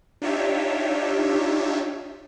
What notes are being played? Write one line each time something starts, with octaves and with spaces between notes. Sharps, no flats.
D4 D#4 F4 G4 C#5 E5